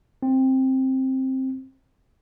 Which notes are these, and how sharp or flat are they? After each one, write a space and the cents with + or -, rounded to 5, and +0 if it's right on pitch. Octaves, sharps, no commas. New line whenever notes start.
C4 +10